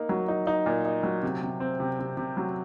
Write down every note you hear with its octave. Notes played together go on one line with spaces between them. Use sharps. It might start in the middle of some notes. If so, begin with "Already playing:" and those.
Already playing: A#3 D#4
F#3
D#4
D#4
A#2
D#4
F#3
C3
C3
C4
C3
C3
C3
F#3